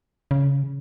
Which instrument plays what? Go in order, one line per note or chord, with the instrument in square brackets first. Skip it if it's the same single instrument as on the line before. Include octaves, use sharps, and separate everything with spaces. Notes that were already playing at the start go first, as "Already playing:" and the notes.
[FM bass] C#3